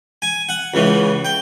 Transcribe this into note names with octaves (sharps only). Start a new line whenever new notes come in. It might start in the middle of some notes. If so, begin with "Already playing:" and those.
G#5
F#5
C#2 C#3 E3
G5